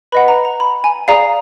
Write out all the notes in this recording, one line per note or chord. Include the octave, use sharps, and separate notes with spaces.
B4 D#5 F#5 B5
A#5
A#5
B5
G#5
G#4 D5 F5 A#5